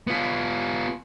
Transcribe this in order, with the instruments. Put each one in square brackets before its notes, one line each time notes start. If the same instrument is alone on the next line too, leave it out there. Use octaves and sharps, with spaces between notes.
[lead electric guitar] B3 F4